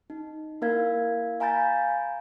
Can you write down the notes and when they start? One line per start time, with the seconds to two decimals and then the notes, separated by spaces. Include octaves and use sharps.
0.10 D#4
0.62 A#3 E4 A#4 F5 G#6
1.40 F5 G#5 A#5 B5 G6 A6